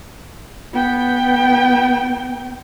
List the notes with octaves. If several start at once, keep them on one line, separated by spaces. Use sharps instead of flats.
B3 G5